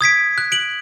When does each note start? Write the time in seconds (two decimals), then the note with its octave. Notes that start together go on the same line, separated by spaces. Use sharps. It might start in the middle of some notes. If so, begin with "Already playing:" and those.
0.01 D#6 G#6 B6 D7
0.38 F#6
0.52 D7 F#7